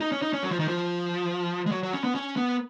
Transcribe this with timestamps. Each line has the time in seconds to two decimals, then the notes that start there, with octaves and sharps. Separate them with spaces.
0.01 D#4
0.12 C#4
0.22 D#4
0.33 C#4
0.43 F#3
0.51 F3
0.59 D#3
0.68 F3
1.66 G#3
1.71 F#3
1.83 F#3
1.93 C#4
2.04 B3
2.15 C#4
2.36 B3